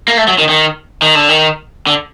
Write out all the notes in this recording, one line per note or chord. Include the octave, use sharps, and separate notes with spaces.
A#3
A3
F#3
D#3
D#3
D#3
D3
D#3
D3